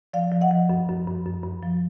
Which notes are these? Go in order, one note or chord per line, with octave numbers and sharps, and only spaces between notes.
F3 D5 F5
F3
D#5 F#5
F3
F#2
F#2
F#2
F#2
F#2
F3